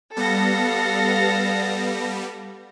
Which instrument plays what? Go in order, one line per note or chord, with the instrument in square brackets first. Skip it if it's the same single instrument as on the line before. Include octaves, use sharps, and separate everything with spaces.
[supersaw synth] G3 B3 [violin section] A4 F5 A#6